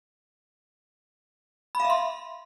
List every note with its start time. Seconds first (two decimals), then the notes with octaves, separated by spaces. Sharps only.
1.75 B5
1.80 F5
1.85 E5
1.90 C6